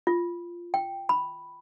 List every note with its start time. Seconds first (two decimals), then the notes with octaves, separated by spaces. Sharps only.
0.07 F4
0.74 G5
1.09 B5